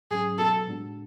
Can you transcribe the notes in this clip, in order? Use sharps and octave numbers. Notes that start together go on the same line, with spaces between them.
G#2 F#3 C#4 G#4
B2 F#3 B3 F#4 A4
A2 G#3 D4 F#4